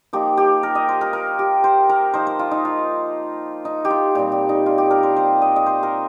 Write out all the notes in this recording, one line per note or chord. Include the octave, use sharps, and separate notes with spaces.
F3 A#3 D#4 G4
G4
A#4
D#5
C5
A#4
A#4
G4
C5
A#4
F3 D#4 C5
C5
F4
D#4
F4
D#4
G4
F4
A#2 G3 C4 G4
G4
D#4
F4
G4
A#4
C5
C5
D#5
D#5
C5
A#4